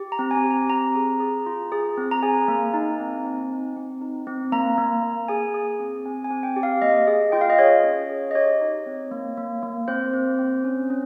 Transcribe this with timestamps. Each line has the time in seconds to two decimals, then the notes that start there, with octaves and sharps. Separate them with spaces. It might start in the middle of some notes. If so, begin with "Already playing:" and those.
Already playing: G4
0.12 A#5
0.19 C4
0.31 G#5
0.44 G4
0.50 A#5
0.70 C4 A#5
0.95 G#4
1.20 G#4
1.46 F4
1.72 G#4
1.97 C4
2.11 A#5
2.23 G#4 G#5
2.48 A#3
2.74 D#4
2.99 C4
3.25 C4
3.50 D#4
3.76 C4
4.02 D#4
4.27 C4
4.52 A#3 A#5
4.78 A#3
5.03 A#3
5.28 G#4 G#5
5.54 G#4
5.80 C4
6.05 C4 G#5
6.24 G#5
6.31 C4
6.43 G5
6.56 G4
6.63 F5
6.82 A#3 D#5
7.07 G#4
7.32 F4 G5
7.41 F5
7.50 D#5
7.58 G#4 C#5
7.83 C#4
8.09 G#4
8.31 D#5
8.35 G4 C#5
8.61 D#4
8.86 C4
9.11 A#3
9.37 A#3
9.63 A#3
9.88 C4 C5
10.13 C4
10.38 C4
10.64 C#4
10.90 C#4